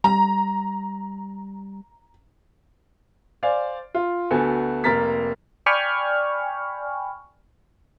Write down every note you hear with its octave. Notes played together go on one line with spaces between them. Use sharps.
G3 A#5
C5 D5 F5 G#5
F4
D2 B3 F#4 A4 G#5
F1 A#3 A#4 A#5 A6 B6
D5 G5 G#5 B5 C#6 F6